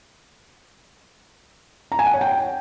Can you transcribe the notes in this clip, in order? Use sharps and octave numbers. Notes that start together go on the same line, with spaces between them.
A#5
G#5
F#5
C#5
G5